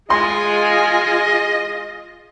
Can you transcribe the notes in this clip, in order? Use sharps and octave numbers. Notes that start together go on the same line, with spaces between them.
G#3 F4 G#4 D#5 G#5 C6